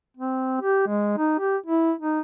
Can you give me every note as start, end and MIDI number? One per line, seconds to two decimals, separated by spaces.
0.17 0.56 60
0.61 0.83 67
0.87 1.16 56
1.18 1.38 63
1.40 1.57 67
1.66 1.93 64
2.01 2.21 63